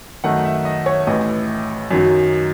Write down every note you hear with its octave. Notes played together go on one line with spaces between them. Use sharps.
F#2 D#3 A3 D#4 F#5
E5
D#5
C#5
A1 A2 E3 D#5
F#2 D#3 F#3